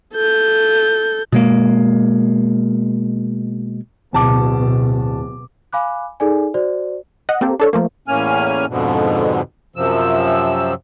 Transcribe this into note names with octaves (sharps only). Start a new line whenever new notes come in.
A4 G6
B2 G#3 A#3
D1 B2 A5 D6
F5 G#5 B5 D6 F#6
D#4 G#4 A4 D5 G#5
F#4 C5 D5
D#5 F#5
A#3 C4 G4 A4
D4 A4 C#5
F3 A3 A#3
E2 A2 A#3 C#4 G#5 F6
F2 G#2 B2 D3
F#2 C3 F3 E6